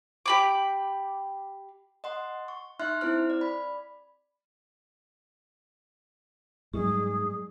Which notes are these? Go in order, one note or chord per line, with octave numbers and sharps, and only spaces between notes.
G4 B5 D6
D#5 F#5 C6
C#6
D#4 E5 C6 F6 F#6
C4 E4 C5 F6
D5
B5
G#2 F#3 G3 G#4 C#6